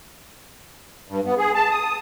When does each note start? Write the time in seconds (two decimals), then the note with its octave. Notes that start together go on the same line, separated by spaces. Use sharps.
1.08 G2
1.26 B3
1.38 G#4
1.55 A5
1.71 D#6